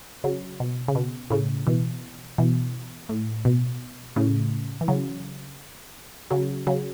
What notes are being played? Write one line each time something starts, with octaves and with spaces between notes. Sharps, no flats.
C#3 F#3
B2
C#3
B2
A2 C#3
B2 E3
B2 E3
A2
B2
A2 C#3
E3
C#3 F#3
C#3 F#3
C#3 F#3